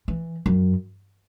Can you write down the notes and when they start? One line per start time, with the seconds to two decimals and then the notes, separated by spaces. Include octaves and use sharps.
0.08 E3
0.46 F#2